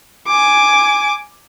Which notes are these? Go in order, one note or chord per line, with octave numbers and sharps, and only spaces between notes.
G#5 D6